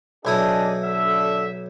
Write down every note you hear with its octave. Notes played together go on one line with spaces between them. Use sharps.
B1 D4 E4 G#4 D#5 D#6
D3 E5